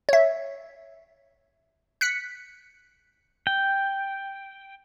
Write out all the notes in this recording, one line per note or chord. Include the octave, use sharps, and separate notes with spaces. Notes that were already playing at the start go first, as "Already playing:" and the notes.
C#5 E5
F#6 B6 C#7
G5